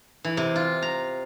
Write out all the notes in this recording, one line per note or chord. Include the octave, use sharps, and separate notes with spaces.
E3
C3
F4
A#5